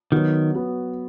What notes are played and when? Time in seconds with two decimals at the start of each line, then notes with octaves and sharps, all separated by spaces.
0.12 D#3 F#3 B3 F#4
0.55 F#3 B3 F#4